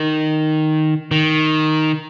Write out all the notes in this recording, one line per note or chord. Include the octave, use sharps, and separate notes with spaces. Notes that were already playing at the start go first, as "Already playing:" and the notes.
Already playing: D#3
D#3